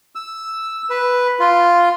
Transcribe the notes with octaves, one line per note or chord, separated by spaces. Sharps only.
E6
B4
F4